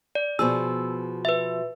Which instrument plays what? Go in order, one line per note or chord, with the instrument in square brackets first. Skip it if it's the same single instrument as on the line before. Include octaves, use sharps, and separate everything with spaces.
[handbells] D5
[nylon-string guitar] B2 F3 G#4 [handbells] E6
[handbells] B4 E5